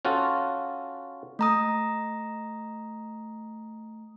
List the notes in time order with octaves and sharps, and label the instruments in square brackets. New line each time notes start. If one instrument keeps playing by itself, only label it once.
[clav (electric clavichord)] C#4 F4 F#4 A4
[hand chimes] A3 A#5 D#6